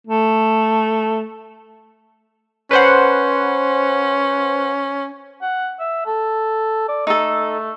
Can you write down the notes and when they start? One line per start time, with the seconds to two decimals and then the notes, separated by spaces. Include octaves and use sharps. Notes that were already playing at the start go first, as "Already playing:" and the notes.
0.07 A3
2.71 C#4 B4 C5 F#5
5.42 F#5
5.80 E5
6.06 A4
6.89 D5
7.07 A3 D#4 A4